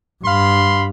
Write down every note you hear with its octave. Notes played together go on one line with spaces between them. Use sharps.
G2 F5 B5 C6